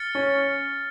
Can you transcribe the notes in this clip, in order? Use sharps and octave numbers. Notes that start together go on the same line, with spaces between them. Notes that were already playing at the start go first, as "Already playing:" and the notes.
Already playing: F6 A6 C#7
C#4